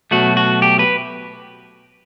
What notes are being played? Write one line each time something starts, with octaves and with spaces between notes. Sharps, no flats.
B2 F#3 A3 F#4
F#4
G4
B4